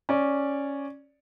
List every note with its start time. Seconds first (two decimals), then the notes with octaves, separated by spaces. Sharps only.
0.09 C#4 D5